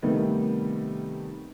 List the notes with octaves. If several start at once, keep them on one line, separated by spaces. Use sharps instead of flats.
C3 D#3 G3 A3 B3 D#4